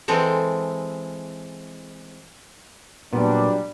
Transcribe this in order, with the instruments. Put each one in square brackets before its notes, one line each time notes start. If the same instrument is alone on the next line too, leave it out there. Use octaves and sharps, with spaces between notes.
[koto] E3 G#3 C4 A4
[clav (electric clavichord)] A#2 B3 [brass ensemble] F#3 G3 D4